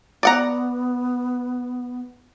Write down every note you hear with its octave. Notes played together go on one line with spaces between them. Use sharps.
B3 D5 F#5 A#5